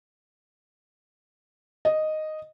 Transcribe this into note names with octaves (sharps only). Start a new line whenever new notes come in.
D#5